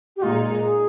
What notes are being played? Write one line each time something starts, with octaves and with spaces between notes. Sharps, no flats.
G4
A#2 G#3 D#4 F4
G#4